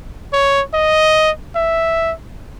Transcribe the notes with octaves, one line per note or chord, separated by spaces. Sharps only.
C#5
D#5
E5